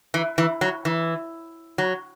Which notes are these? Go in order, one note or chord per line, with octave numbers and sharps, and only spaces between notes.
E3
E3
F#3
E3
F#3